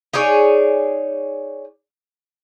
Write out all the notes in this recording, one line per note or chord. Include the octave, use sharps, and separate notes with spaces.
D#4 G#4 C#5 D5